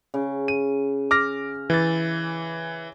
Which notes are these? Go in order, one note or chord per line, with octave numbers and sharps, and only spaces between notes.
C#3
D#7
D6 F6 A#6
E3 A6